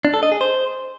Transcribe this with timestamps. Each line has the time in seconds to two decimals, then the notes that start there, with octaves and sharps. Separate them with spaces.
0.05 D4
0.14 A4
0.23 D#5
0.32 G#4
0.41 C5